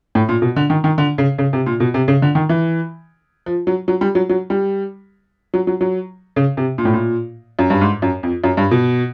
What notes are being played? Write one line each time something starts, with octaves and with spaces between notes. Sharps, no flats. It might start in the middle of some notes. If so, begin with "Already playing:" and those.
A2
A#2
B2
D3
D#3
D#3
D3
C#3
C#3
C3
A#2
B2
C3
C#3
D3
D#3
E3
F3
F#3
F#3
G3
F#3
F#3
G3
F#3
F#3
F#3
C#3
C3
A#2
A2
A#2
F#2
G2
G#2
F#2
F2
F#2
G2
B2